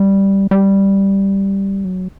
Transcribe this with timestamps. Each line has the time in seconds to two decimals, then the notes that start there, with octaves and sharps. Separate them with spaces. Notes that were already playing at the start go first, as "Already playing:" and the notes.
Already playing: G3
0.51 G3
1.85 F#3